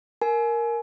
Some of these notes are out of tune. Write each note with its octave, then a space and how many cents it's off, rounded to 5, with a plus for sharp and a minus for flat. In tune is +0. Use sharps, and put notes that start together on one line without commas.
A#4 +0 G#5 +30